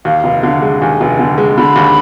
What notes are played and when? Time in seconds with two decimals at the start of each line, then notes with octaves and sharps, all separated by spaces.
0.05 D#2 F5
0.24 F1
0.43 D3
0.62 G#3
0.81 D#2 G#5
1.01 F1
1.19 D3
1.38 G#3
1.57 D3 B5
1.76 D#2